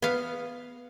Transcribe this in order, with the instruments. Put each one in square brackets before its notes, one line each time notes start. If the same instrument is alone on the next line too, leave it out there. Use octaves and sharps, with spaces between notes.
[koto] B3 F5